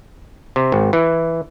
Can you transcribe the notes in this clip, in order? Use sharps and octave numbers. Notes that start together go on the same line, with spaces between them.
C3
G#1
E3